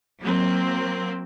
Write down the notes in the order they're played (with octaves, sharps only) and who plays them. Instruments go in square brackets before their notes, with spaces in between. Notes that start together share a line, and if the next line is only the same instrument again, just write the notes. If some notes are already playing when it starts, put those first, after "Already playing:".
[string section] F#3 A#3 C4